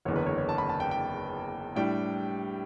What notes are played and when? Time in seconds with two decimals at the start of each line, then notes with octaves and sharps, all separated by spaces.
0.05 F#1 E2 D3 C#5
0.16 B4
0.26 C#5
0.38 C#5
0.49 A5
0.58 B5
0.69 A5
0.80 G5
0.91 G5
1.76 A2 G3 D4 G5